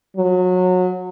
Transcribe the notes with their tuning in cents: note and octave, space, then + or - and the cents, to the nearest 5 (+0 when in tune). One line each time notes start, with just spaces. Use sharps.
F#3 -25